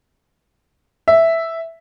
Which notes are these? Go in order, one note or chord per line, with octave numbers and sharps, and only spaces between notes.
E5